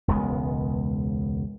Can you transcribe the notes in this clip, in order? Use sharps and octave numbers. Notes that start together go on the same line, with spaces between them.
E1 C#2 G#3 B3